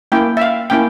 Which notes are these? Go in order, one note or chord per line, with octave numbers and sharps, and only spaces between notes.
A#3 C#4 E4 G5
E5
F5
A#3 C#4 E4 G5